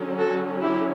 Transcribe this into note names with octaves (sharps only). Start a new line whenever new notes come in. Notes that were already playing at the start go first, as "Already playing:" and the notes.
Already playing: D3 F#3 C#4
F#4 A4
E4 G4